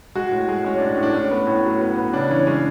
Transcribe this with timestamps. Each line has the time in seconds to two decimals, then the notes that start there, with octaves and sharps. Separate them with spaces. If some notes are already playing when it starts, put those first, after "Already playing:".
0.15 G#3 F#4
0.31 A2
0.49 G#3
0.64 G#3 C#4
0.78 A2 D4
0.89 C#4
0.97 A2
1.03 D4
1.14 A2 C#4
1.31 B3
1.47 A2
1.65 F#3
1.81 B3
1.97 B3
2.13 C#3 D4
2.30 E3 C#4
2.47 G#3 C#4